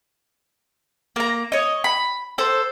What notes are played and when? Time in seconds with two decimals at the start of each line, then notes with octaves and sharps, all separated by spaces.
1.16 A#3 A#5
1.52 C#5 D#5
1.84 B5
2.38 A4 C5